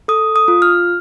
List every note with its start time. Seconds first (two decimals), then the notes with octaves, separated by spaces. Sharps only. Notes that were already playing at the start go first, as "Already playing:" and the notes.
0.08 A4 D#6
0.36 D#6
0.48 F4
0.62 F6